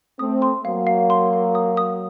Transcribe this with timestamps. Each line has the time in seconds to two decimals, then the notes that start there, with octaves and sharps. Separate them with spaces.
0.19 A3 C4 D#6
0.42 C6
0.65 F#3 A#3 F5
0.87 F5
1.10 C6
1.33 F5
1.55 D#6
1.77 D#6